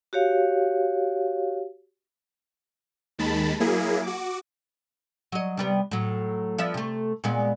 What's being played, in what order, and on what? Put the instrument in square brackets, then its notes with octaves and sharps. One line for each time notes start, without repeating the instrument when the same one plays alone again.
[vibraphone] F#4 G4 C#5 F5
[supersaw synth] D#2 D#3 G#3 A5 B5
F#3 A#3 E4 G#4
F#4 D6
[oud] F#3 D#5
C3 G3 B3
A2 F#3
F3 B3 E5
C3 A3
A#2 G#3 B3